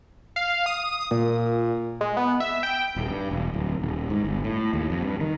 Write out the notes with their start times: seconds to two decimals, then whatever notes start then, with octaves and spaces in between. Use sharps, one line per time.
0.36 F5
0.66 D#6
1.11 A#2
2.01 G#3
2.17 B3
2.40 E5
2.63 G5
2.96 D#1
3.10 G2
3.31 E1
3.54 D1
3.82 D#1
4.10 G#2
4.25 G1
4.44 A2
4.73 D#2
4.90 F2
5.03 G2
5.20 D#3